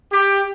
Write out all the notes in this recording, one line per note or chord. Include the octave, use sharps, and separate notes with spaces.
G4